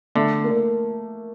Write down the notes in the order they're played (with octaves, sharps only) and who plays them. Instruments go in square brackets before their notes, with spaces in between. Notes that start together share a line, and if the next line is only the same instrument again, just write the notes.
[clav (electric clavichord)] D3 [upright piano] A3
[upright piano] A#3